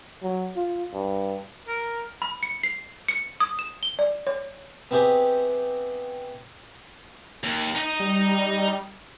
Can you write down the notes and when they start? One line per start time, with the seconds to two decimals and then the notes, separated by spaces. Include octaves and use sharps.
0.23 F#3
0.56 F4
0.93 G2
1.68 A#4
2.22 B5
2.43 C#7
2.63 C7
3.08 C#7
3.40 D#6
3.59 E7
3.83 G7
3.99 D5
4.27 C#5
4.91 B3 C4 E4 G4 G#4
7.43 D#2
7.75 D#4 D#5
8.00 G3